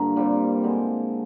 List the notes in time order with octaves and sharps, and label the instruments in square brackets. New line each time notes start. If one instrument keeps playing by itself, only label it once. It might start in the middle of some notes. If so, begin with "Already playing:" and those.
Already playing: [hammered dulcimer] G2 D3 A#3 F4
A#2 G3 C4
D3 G#3 C4